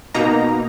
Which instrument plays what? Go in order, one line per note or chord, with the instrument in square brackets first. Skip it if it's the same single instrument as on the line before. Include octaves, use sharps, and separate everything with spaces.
[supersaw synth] B2 A#3 D#4 A#5